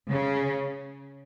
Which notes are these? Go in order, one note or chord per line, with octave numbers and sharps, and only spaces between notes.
C#3